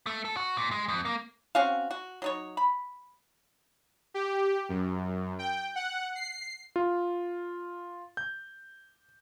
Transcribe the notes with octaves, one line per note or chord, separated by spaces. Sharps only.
A3
A4
F#4
A#2
G#3
F2
A#3
C4 C#4 F#4 F5
F#4
F#3 D#4 C#5
B5
G4
F#2
G5
F#5
C7
F4
G6